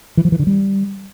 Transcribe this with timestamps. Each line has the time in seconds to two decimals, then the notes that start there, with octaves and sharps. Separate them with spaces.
0.17 E3
0.25 F3
0.32 E3
0.39 D3
0.47 G3